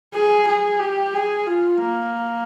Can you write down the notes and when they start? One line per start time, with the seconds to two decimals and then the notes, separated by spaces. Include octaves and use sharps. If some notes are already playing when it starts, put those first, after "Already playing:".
0.14 G#4
0.48 G#4
0.80 G4
1.14 G#4
1.47 F4
1.80 A#3